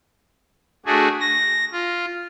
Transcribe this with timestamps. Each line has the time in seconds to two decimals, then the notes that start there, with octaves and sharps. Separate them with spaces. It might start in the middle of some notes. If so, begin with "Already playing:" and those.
0.86 A3 D4 F#4 G#4
1.20 A#6
1.72 F4